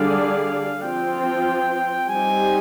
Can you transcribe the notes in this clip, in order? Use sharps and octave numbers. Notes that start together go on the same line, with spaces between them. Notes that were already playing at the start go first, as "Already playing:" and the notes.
Already playing: D3 G3 D4 G#4 D5 F5
F3 C4 F4 C5 G5
G3 C4 D#4 G4 C5 G#5